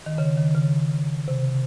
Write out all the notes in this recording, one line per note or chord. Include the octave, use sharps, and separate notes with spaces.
D#3
C#3
D#3
C#3
C3